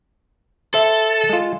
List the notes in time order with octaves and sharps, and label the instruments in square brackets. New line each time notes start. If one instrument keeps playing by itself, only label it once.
[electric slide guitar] A4 [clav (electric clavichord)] C5 E5
[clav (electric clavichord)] G#3 F4